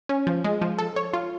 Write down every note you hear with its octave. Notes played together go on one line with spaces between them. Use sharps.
C#4
F3
G#3
F3
A4
C#5
F4